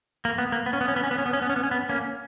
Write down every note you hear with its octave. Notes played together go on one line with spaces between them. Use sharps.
A#3
B3
A#3
B3
C#4
B3
C#4
B3
C#4
B3
C#4
B3
C#4
B3
C#4
B3
C#4
B3
A#3 C#4